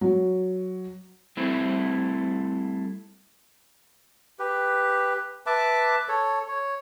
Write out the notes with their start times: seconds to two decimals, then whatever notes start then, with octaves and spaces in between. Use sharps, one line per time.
0.01 F#3
1.37 G3 A3 C4 E4
4.39 G4 B4
5.46 B4 E5 A5 D6
6.08 A4 C#5
6.48 C#5